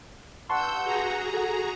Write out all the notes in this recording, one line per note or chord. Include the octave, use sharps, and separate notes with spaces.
G2 F#5 A5 C6 C#6 E6 G6
F#4 G#4 A#5
A4 F#5